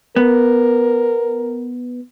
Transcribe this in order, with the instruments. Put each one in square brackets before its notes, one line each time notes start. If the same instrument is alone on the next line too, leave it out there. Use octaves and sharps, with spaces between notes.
[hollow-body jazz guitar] B3 [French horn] A#4